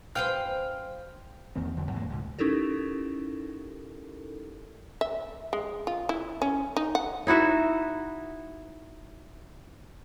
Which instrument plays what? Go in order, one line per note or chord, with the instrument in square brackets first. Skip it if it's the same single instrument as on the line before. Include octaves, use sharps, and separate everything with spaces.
[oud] F#2 B4 C5 [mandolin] F5 G5 [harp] F6
[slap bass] E2 D#3 A#3 C4
E2 D3 F#3
G#2 E3 A#3
C#2 G#2 B2
[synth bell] C#4 D#4 E4 G4 A4 A#4
[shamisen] E5
G#3
F4
E4
C#4
D#4
F#5
[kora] D#4 E4 F#4 E5